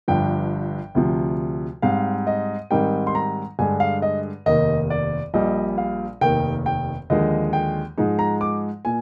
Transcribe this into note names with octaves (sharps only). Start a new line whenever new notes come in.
G1 G2 F3 G5
D2 C3 F3
G#2 G3 C4 F5
D#5
G#2 D#3 G3 C4 D#4 G5
C6
A#5
G2 D3 G#3 G#5
F5
D#5
F1 D#2 D#3 A#3 D#5
D5
A#1 A#2 G3 D#5
F5
F1 D#2 D#3 A#3 G5
G5
D#2 D3 F3 G#3 D#5
G5
G#2 F3 G#3 D#4
A#5
D6
A#2 G#5